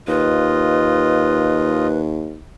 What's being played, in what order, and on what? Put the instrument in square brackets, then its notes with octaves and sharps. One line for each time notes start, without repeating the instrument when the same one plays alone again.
[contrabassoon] D#2 [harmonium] F4 D#5 [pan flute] B4